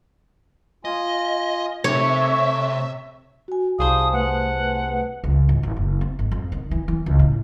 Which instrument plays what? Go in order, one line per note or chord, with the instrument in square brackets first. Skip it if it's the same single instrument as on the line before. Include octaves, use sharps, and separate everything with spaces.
[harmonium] F4 G#5 [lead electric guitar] D#5
[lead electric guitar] C3 [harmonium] A3 [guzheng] C#5 [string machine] E5
[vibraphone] F#4 G#5
[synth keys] C2 G#4 C5 [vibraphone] F5 A5 [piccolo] D#6
[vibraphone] A3 B4 [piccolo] F#5
[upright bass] C#2
G#1
G#1
F#1
C4
G#1
F2
D#3
E3
E3
C#2
A2